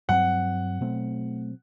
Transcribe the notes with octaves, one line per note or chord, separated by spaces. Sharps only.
G2 F#3 C4 F#5
B2 F#3 A3 C4